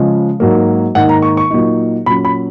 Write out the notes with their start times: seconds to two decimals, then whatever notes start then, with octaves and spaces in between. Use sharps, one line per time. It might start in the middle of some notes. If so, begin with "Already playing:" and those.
Already playing: C#3 F3 G#3
0.40 G#2 F#3 A#3
0.95 G#2 D#3 A#3 F#5
1.09 A#5
1.22 C#6
1.37 C#6
1.51 A#2 F#3 A#3 D#4
2.06 A#2 F#3 C#4 B5
2.25 B5